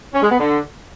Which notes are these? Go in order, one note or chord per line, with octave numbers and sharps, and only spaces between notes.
C#4
G#3
B3
D3